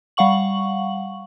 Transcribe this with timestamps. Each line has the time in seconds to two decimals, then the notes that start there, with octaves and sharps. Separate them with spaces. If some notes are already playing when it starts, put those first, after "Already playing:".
0.17 G3 F5 F#5 C#6 F#7